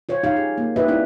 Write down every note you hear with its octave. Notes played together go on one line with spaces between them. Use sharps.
F4 C5 C#5
D#4 F4 G4 C#5 F5
G#4
A#3
D#4 F4 G4 B4 D#5 E5
C4 D4 E4